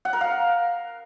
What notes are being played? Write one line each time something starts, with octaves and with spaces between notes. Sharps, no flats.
F#5
A#4
F5